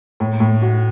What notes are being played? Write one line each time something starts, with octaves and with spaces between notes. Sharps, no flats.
A2
A2
F#4